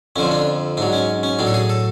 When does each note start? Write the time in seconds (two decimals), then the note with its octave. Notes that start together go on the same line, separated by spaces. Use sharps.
0.16 F2 D3 F3 C#4
0.31 D4
0.77 G#2 F#3 D4
0.93 C#4
1.23 C#4
1.39 A2 F#3 D4
1.47 A4
1.54 G#4
1.70 A4